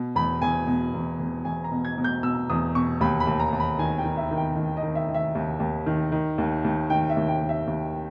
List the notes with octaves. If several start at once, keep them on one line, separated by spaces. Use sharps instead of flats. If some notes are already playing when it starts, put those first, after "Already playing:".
Already playing: B2
E2 B5
E2 G#5
B2
E2
E2
E2 G#5
A#5
B2
G#6
B2
G6
B2 E6
E2 D#6
B2 C#6
D#2 B5
B5
D#2
A#5
D#2
B5
D#3 G#5
G5
D#3
E5
D#3
G5
D#3
D#5
D#3
E5
D#3
E5
D#2
D#2
D#3
D#3
D#2
D#2
D#3 G5
E5
D#2
G5
D#2
E5
D#2